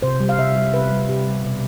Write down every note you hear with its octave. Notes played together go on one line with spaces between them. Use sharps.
C3 C5
G3
F5
C3 E5
G3
C3 B4
G3
C3 G4
G3
B2